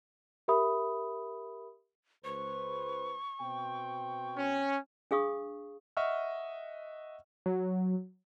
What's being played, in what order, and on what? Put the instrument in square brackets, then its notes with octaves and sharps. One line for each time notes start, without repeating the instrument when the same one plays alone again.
[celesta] G4 A#4 E5 B5 D#6
[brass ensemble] C#2 B4 C5 [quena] C#6
[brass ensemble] B2 C4 G5
[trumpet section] C#4
[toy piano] D4 G#4 F5 C#6 D#6
[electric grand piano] D#5 E5 F#5 C#6 E6 F6
[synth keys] F#3